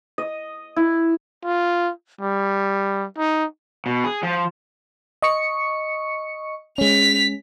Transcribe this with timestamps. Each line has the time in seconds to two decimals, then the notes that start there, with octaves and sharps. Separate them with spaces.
0.18 D#5
0.76 E4
1.44 F4
2.21 G3
3.18 D#4
3.86 B2
4.04 G#4
4.23 F3
5.22 D#5 C#6 C#7
6.78 G#3 C#4 B6 F7